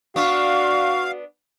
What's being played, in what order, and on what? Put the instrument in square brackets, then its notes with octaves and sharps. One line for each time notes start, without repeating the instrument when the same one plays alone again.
[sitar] B3 D4 [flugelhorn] F#4 [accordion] F5 [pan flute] C#6